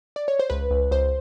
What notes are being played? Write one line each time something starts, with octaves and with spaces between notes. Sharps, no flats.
D5
C#5
C5
C#2 B4
C#2
C#2 C5